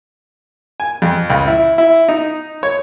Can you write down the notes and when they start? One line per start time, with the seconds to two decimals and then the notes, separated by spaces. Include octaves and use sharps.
0.80 G#5
1.02 F2
1.30 C#2
1.47 E4
1.78 E4
2.09 D#4
2.63 C#5